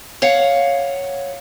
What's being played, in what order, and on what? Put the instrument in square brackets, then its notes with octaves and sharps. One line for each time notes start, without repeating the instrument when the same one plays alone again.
[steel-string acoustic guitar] C#5 F5 F#5